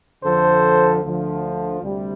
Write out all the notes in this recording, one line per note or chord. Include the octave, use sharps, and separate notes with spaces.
F2 D3 F3 A4 C5
D2 D3 F3
D2 C3 G3